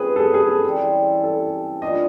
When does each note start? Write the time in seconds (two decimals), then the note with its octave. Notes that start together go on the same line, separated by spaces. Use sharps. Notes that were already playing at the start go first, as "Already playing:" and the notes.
Already playing: C3 F3 G#3 C#4 G#4 B4
0.16 A4
0.19 G#4
0.34 G#4
0.49 A4
0.65 C#3 E3 G3 C4
1.24 A4
1.82 E3 A3 D4 F4 D#5